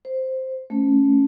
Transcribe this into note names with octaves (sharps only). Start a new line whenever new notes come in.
C5
A3 C#4